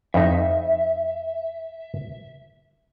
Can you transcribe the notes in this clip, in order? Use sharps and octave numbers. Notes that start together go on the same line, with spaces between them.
F2 D#4 E5